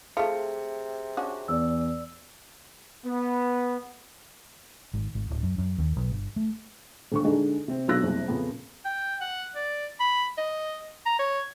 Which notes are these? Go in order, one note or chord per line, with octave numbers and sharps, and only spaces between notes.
C3 A3 F4 G#4 C#7
C#4 D4 F#4
E2 D5 E6
B3
G#1
G#1
D1
F#2
F#2
D#2
B1
G1
A3
D#1 D3 C#6
D3 G#3 D4 D#4
C3 C4
B1 F#3 D4 E6 F#6 A#6
F#1 C2
F2 A#2 C#3 A#3 B3
G5
F#5
D5
B5
D#5
A#5
C#5